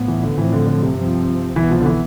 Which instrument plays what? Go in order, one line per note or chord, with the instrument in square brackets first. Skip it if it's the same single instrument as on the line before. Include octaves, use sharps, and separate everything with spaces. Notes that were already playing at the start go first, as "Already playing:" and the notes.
Already playing: [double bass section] A2 F3 B3
[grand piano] E3
D3
[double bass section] A2 F3 C4 [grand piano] E3
[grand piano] D3
D3
C3
[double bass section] G2 F3 C4
[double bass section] C2 B2 B3 [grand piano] E3
[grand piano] F3
D3
E3